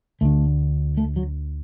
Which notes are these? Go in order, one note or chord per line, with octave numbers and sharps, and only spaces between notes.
D2 D3 A3
A3
F#3